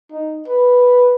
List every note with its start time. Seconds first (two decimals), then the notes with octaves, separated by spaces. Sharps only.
0.12 D#4
0.48 B4